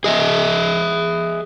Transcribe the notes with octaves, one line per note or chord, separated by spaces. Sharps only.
G#4 D#5 E5